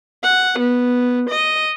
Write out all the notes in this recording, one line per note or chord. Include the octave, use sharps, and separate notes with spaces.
F#5
B3
D#5